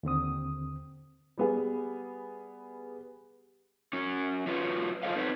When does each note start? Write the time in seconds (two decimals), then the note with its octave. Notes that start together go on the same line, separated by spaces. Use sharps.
0.03 D#2 D3 C4 D#6
1.38 G3 B3 G#4
3.93 F#3 C#4
4.47 F#3 F4 B4 C#5
5.03 F4 A4 C5 C#5 D#5 F5
5.16 C4 D#4 B4 C#5